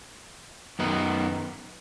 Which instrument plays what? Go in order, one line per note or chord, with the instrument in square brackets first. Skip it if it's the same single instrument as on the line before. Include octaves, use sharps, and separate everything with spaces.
[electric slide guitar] F#2 D#3 B3 D#4